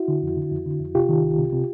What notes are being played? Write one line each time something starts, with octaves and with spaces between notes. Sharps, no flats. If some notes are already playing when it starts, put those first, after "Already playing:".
Already playing: E4 F#4
D3
F2
D3
F2
D3
F2
C3 F4 G4
D#3
C2
C3
C3